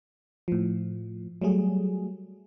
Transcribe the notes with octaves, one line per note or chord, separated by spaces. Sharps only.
A2 F3
F#3 G3 A3 G#4